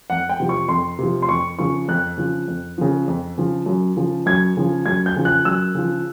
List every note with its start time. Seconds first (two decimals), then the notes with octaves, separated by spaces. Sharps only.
0.10 F2 F#5
0.29 G5
0.40 C3 F3
0.49 C#6
0.69 F2 C6
0.99 C3 F3
1.22 C6
1.29 F2 C#6
1.59 C#3 F3 C#6
1.88 F2 F#6
2.17 C#3 F3
2.48 F2
2.78 C#3 F3
3.08 F2
3.38 C#3 F3
3.66 F#2
3.97 C#3 F3
4.26 F#2 G#6
4.57 C#3 F3
4.86 F#2 G#6
5.06 G6
5.16 C#3 F3
5.25 F#6
5.45 F#2 E6
5.75 C#3 F3